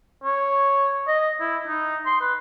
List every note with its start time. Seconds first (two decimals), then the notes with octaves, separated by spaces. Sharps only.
0.24 C#5
1.07 D#5
1.40 E4
1.68 D#4
2.06 C6
2.21 B4